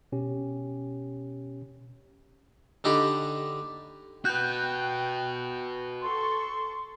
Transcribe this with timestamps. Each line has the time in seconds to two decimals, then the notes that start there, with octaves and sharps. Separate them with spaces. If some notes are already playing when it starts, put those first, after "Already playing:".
0.12 B2 C#4 G4
2.84 D3 D4 D#4 G4 B5
4.25 F#4 B4 G5 F#6 G6
6.02 A4 C6 C#6